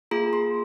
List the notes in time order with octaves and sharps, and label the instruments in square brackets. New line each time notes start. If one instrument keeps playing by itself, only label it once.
[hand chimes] A#3 F4 G#4 A#5
C6